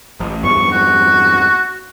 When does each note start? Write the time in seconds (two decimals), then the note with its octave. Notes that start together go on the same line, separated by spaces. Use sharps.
0.20 A1
0.44 E2 G2 B3 C#6
0.72 F#4